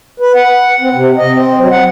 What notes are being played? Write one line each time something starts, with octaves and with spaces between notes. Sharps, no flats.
B4
F#5
C4
C3
D#5
C4
F#3
F#5